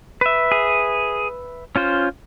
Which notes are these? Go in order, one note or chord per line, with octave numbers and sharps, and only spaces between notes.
B4 E5
G#4
C#4 F4 C5